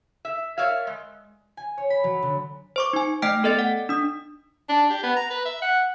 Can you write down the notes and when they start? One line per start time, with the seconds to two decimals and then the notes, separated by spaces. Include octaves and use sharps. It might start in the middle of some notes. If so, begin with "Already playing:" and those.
0.25 E5
0.58 A#4 C#5 D5 E5 F5
0.87 G#3
1.57 G#5
1.78 C#5
1.90 B5
2.04 F#3
2.22 D3
2.76 C5 C#6 D6
2.93 D#4 G#5
3.22 A3 D#5 G5 F6 B6 D7
3.44 B3 A4 D5 D#5 A6 C#7
3.59 F#5
3.89 D4 D#6
4.69 D4
4.90 G4
5.03 B3
5.16 A#5
5.31 B4
5.45 E5
5.62 F#5